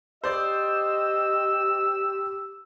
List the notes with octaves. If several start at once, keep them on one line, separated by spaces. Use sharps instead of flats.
G4 C5 D5 D#5 E6